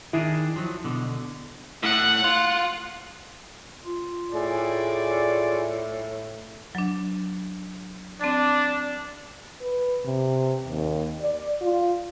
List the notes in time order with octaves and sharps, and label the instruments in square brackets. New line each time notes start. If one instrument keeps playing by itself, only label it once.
[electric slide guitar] D#3 D4 G#4 [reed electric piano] E4
[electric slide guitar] F3 F#3
B2 D3
[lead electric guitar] A2 [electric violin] F#5 F#6
[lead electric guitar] F4
[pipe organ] F4
[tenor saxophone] A2 [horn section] G#4 D5
[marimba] F#3 D4
[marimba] C4 A6 [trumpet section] D4
[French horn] B4
C3
D#2
D5
F4